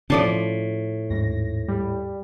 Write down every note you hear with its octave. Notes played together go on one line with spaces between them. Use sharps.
A2 F3 C#4 D5 A5
D#2 G#2 A#6
G3